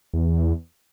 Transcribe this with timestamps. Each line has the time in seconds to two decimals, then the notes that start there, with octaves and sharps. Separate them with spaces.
0.14 E2